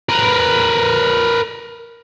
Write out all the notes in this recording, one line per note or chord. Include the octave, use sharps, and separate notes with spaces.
A#4 B4